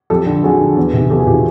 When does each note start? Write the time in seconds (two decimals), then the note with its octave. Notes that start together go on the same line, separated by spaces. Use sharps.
0.10 F2 G4 A4
0.26 D3
0.43 F2 F#4 G#4
0.61 D3
0.77 E2
0.94 C3 D#3
1.10 E2 G4 A4
1.19 F#4 G#4
1.27 C3 F4 G4
1.32 D#3